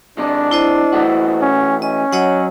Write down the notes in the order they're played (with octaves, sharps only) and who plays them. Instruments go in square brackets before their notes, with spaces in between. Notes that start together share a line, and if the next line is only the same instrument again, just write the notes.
[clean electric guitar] C3 G#3 [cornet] D4
[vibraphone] E4 C5 D#5
[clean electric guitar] E3 A3 F#4
[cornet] C#4
[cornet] C#4 [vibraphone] D#5
[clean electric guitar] F#3 [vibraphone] C#5 D#5 F#5